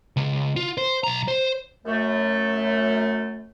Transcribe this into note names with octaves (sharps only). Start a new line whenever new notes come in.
C#2
F4
C5
B1 A#5
C5
F#2 A3